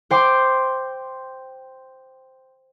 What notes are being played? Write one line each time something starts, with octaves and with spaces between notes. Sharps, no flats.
C5 G5 C6 D6